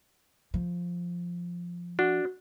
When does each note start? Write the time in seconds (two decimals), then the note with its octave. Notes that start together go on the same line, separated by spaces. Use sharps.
0.54 F3
1.99 D4 F#4